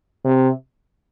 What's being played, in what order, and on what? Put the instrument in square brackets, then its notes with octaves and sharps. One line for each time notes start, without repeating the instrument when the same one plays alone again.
[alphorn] C3